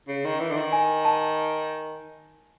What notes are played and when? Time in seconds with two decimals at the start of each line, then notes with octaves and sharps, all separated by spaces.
0.08 C#3
0.25 D#3
0.40 E3
0.51 D3
0.57 D#3
0.73 G#5
1.05 A5